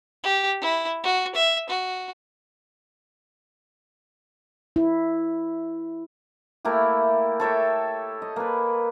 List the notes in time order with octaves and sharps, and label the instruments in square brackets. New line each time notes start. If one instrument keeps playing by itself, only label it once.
[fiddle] G4
E4
F#4
E5
F#4
[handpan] E4
[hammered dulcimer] A3 A#3 E4 G4
A4 C#5 E5 G5
D#5
A#3 B4